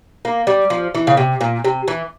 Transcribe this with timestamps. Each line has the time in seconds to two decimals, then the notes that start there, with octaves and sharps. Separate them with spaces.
0.25 A#3
0.47 G3
0.70 F3
0.94 E3
1.07 C#3
1.17 C3
1.41 A#2
1.64 C3
1.88 E3